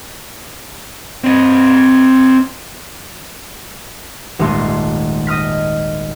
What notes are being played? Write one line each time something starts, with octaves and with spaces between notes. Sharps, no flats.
C4 D#5
D#1 G#1 G#3 A3 F4
D#5 D#6 F6 B6